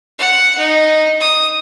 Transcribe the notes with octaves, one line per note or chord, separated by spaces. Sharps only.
F#5
D#4
D#6